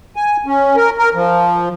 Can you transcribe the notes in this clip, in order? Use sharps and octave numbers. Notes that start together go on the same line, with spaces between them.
G#5
C#4
A#4
A#4
F3